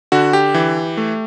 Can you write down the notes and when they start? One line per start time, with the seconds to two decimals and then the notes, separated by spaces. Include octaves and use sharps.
0.12 D3 F#4
0.33 G4
0.54 E3
0.97 A3